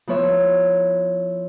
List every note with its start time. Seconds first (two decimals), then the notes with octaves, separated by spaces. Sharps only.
0.07 F3 B3 E4 C#5 E5